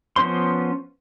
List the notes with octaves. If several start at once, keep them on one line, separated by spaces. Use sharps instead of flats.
F3 B3 C#4 C5 C6